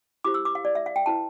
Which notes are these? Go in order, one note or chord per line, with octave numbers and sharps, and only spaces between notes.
E4 G4 C5 D6
E6
D6
F5
D5
E5
F5
G5
E4 B4 A5